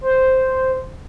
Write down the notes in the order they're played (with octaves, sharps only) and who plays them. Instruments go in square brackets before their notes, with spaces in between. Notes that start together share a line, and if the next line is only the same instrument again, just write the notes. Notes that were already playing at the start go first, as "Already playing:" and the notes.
[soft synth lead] C5